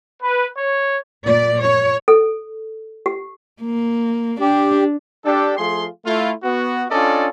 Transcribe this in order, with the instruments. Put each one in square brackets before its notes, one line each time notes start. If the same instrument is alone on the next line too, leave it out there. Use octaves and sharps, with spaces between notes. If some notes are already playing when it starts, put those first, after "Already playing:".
[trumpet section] B4
C#5
[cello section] A#2 D5
C#5
[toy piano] A4
G4
[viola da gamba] A#3
[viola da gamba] D4 [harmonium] G4
[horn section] D4 G4 A4
F3 A3 F4 G#4 C6
A3 E4 F4
B3 F#4
C#4 D4 F4 A4 D5 D#5